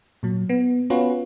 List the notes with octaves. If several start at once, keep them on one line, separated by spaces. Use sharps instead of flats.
A#2 F#3
B3
B3 C#4 F4 F#4 B4